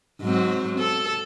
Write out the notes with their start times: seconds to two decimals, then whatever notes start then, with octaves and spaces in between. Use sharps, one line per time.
0.22 G#2 F#3 C4
0.79 A4